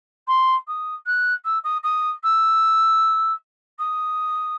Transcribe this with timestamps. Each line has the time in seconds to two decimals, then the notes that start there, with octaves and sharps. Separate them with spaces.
0.28 C6
0.67 D#6
1.06 F#6
1.45 E6
1.64 D#6
1.83 D#6
2.23 E6
3.79 D#6